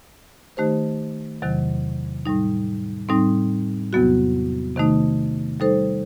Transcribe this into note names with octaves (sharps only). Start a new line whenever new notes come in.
D#3 A3 D#4 G4 C5
E2 C3 D#3 F#3
A2 G3 D#4
A2 G3 C4 D#4
E2 C3 F#3 B3 F#4
C3 D#3 A3 D#4
G3 D#4 A4 C5